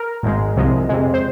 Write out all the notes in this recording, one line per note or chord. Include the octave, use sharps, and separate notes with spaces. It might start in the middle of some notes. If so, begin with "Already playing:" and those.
Already playing: A#4
G#1 G#2 G#3
C2 C3 F3 G#3
F2 C3 G#3
C5